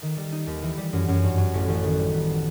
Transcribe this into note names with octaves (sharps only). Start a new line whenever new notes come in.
D#3
G3
D#4
D#2
E3
G3
F#2
F#2
G2
F#3
A1
A1
D#3
G3
B3